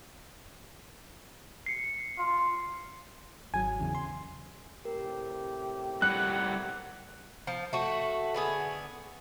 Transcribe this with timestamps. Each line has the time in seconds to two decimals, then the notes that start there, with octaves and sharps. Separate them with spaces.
1.66 C7 C#7
2.18 F4
3.54 G#1 F#3 G#5
3.79 E2 C#3 E3
3.95 C6
4.85 A2 C3 G4 A#4
6.02 G3 E4 F#5 F#6
7.47 F3
7.73 A3 F#4
8.34 D3 B3 G#4